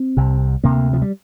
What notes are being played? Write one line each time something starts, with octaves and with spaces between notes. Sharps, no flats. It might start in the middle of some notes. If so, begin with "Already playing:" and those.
Already playing: C4
C2 C3
D2 C3 A#3
F3
G3